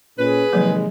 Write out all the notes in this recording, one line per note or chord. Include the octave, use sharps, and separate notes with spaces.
A#2 C#4 G#4 B4
C3 D#3 F3 F#3 G#3 A#3